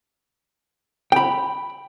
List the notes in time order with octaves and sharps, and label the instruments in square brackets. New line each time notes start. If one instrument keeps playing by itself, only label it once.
[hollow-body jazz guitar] G5 B5